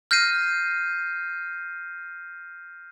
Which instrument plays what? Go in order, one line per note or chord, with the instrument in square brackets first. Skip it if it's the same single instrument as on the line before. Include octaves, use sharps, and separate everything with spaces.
[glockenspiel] F6 G6 A#6 C7 D#7